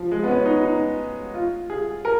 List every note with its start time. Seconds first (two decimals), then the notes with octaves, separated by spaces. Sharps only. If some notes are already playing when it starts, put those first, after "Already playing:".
Already playing: F3
0.11 G#3
0.23 B3
0.28 C#4
0.45 D#4
0.64 D#4
1.34 F4
1.70 G#4
2.05 A#4